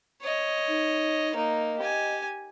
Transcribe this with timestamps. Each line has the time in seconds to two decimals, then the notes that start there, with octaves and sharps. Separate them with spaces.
0.23 C#5 D#5
0.68 D#4
1.35 A#3 D#4 D#5
1.78 G4 G#5